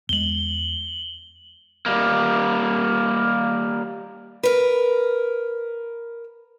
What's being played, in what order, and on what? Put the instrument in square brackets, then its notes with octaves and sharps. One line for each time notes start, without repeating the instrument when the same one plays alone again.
[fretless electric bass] E2 G#3 [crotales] F#7 G7
[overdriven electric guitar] G3 A#3
[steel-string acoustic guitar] A#4 B4